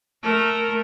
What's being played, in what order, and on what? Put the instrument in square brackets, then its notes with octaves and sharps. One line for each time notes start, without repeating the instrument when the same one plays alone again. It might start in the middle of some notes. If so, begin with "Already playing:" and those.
[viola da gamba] A3 A#4